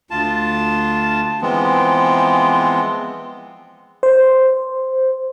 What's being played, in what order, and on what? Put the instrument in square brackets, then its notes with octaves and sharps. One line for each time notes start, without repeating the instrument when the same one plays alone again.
[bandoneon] D2 F4 A5
E3 F3 G#3 B3 C4
[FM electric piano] C5